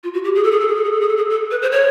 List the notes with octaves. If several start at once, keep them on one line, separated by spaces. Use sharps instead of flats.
F4
F#4
G4
G#4
A4
G#4
A4
G#4
A4
G#4
A4
G#4
A4
G#4
A4
B4
C5
C#5